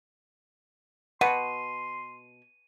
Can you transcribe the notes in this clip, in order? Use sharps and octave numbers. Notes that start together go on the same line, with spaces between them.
B2 F#5 C6 D#7